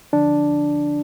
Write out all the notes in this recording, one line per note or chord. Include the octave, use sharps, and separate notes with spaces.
D3 F3 D4